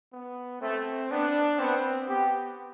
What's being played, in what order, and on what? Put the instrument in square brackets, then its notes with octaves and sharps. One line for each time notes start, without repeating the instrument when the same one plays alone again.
[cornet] B3
[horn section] A3 [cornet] C4
[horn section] B3 [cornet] D4
[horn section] B3 [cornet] C4
[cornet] B3 [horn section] G4